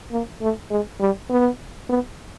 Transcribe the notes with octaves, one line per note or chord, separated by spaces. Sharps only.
A#3
A3
G#3
G3
B3
B3